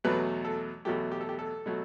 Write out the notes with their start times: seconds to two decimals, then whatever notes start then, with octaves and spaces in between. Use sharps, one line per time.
0.04 E2 B2 F#3 A3 B4
0.45 A4
0.85 E2 B2 F#3 A3 G4
1.12 G4
1.21 A4
1.29 G4
1.39 A4
1.66 B2 F#3 A3